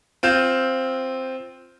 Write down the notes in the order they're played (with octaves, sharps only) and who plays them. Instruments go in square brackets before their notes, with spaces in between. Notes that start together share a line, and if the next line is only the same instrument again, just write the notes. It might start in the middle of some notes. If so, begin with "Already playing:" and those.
[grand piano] C4 F4 G6 E7